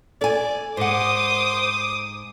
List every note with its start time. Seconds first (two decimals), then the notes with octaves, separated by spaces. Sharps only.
0.21 A4 D5 G#5
0.77 G#2 C5 F#5 D6 D#6